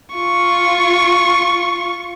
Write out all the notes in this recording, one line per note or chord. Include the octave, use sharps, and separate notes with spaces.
F4 C#6